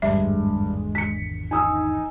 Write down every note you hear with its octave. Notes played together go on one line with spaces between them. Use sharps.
G#1 E2 G2 D3 G#3 E5
B6 C#7
D#4 G#5 D#6 E6